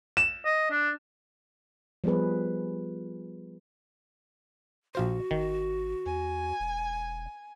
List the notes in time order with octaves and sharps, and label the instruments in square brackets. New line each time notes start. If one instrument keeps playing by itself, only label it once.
[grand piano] E7
[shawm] D#5
D4
[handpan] F3 G3 B3 G#4 B4
[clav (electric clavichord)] A#1 F4 C5 [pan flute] F#4
[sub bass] G#1 [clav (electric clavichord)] D#3
[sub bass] E2 [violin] G#5
[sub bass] E1